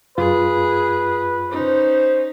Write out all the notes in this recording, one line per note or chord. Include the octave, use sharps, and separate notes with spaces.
F#2 F4 G#4 B4
C#4 D#4 C5